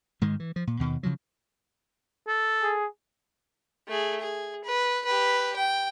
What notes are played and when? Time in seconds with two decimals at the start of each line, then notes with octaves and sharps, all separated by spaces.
0.21 G#2 D#3 G#3
0.40 E3
0.56 F3
0.67 A#2
0.79 D#2 B2 D#3
1.03 C#3 F3 F#3
2.28 A4
2.62 G#4
3.88 A3 G#4
4.20 G#4
4.64 B4
5.05 G4 B4
5.56 G5